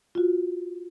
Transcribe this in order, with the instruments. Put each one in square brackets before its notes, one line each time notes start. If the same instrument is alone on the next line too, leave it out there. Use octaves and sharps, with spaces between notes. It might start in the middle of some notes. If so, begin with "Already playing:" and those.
[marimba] F4 F#4